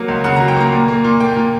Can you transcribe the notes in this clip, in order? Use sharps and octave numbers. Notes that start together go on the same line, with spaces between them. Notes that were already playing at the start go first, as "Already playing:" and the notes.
Already playing: F#3 A#3 F#5
C#2
C#3 F#5
A#5
F#3
G5
A#3 A#5
A#2
A#3
A#2
A#3 G5
A#2